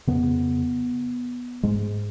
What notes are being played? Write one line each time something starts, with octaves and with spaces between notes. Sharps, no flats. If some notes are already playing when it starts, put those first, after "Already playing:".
F2 C#3 B3
G#2 G#3